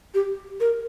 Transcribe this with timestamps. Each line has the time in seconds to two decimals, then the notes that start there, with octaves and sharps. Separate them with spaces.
0.14 G4
0.60 A#4